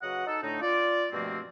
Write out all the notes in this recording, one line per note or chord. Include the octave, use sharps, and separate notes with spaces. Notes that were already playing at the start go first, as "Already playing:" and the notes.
C#3 F#3 F#4 B4 D#5 F#5
D#4 A4
A2 D3 A3 D4 D#4
F4 D5
G2 B2 F3 A3 A#3 C4